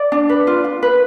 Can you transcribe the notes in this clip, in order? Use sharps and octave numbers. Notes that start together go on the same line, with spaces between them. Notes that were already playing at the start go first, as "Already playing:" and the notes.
Already playing: D5
D4
B4
F4
F4
B4